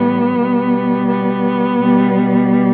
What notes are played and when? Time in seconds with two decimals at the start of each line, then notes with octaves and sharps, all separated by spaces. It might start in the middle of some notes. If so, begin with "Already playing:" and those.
Already playing: A2 E3 G3 B3
0.39 B2 G3
1.09 B3
1.78 B2 G3